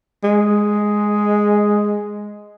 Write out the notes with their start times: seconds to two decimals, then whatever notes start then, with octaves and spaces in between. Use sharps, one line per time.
0.24 G#3